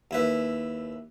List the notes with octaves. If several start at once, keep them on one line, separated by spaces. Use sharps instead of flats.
D#2 E4 B4